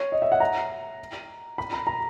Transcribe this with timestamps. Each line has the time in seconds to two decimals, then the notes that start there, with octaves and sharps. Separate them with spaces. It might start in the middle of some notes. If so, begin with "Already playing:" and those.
Already playing: C#5
0.12 D#5
0.22 E5
0.32 F#5
0.40 A#5
1.58 B5
1.73 A#5
1.87 A#5